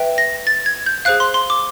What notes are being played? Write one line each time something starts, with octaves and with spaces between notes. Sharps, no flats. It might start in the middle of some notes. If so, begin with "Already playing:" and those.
Already playing: B4 E5 G5
A#6
A6
G#6
G6
G#4 C5 F5 F#6
C6
C6
D6